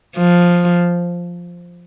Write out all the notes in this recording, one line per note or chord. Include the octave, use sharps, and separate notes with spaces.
F3